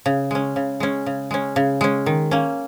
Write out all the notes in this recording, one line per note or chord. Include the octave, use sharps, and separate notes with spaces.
C#3
G#3 C#4
C#3
G#3 C#4
C#3
G#3 C#4
C#3
G#3 C#4
D#3
A#3 C#4